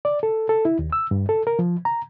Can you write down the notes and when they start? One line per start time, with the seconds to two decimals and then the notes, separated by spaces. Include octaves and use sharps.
0.05 D5
0.23 A4
0.49 A4
0.65 E4
0.79 D#2
0.93 E6
1.11 G2
1.29 A4
1.47 A#4
1.59 F3
1.85 A#5